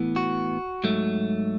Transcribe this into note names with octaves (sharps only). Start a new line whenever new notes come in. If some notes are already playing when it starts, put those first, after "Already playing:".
Already playing: A2 E3 B3
F#4
G#2 F#3 A3